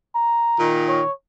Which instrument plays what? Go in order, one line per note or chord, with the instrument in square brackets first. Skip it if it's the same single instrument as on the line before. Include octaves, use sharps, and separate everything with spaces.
[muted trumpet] A#5
[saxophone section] A#2 D#3
[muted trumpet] C#5